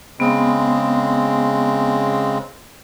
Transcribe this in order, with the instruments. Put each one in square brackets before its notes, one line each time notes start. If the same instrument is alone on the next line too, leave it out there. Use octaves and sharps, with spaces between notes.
[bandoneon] C#3 G#3 C4 [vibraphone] B3 D#6